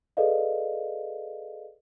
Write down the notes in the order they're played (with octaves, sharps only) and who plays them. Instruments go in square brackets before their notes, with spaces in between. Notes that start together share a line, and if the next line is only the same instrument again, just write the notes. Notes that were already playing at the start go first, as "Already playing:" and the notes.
[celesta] G#4 A4 B4 D5 D#5 F5